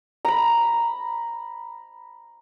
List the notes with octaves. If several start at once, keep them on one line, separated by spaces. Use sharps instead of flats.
A#5 B5